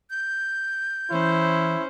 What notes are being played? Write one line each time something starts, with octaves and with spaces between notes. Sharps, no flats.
G6
E3 C#4 E4 C5